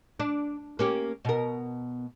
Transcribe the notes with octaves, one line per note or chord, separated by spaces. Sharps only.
D4
A#3 C#4 G4
B2 A#4